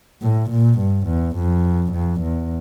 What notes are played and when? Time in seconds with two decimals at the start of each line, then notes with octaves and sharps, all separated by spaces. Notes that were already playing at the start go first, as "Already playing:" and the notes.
0.22 A2
0.50 A#2
0.79 G2
1.07 E2
1.36 F2
1.92 F2
2.21 E2